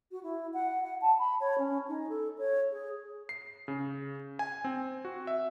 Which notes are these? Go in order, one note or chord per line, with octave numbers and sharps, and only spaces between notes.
F#4
E4
F#5
F#5
A5
B5
C#5
C#4
D#4
A4
C#5
G#4
C7
C#3
G#5
C4
F#4
E5